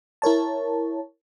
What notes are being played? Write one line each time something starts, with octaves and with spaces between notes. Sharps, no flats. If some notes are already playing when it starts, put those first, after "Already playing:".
E4 A#4 C#5 A5